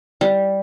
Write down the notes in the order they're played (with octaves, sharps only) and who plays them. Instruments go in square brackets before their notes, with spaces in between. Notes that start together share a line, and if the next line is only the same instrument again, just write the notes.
[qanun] G3